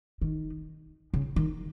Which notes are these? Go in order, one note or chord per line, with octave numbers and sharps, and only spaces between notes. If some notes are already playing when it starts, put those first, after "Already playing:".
D#3
C#3
D#3